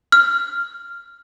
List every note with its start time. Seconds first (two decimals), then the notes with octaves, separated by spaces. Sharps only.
0.12 F6